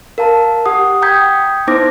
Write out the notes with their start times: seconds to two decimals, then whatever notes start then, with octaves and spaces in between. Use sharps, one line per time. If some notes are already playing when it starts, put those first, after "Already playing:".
0.18 A#4 F5 A5 A#5
0.66 G4 F#5 D#6
1.02 G5 A#5 D#6 G6 G#6 B6
1.67 B3 D#4 E4 C5 D6 A#6